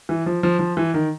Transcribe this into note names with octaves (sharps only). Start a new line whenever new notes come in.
E3
F3
F3
F3
E3
D#3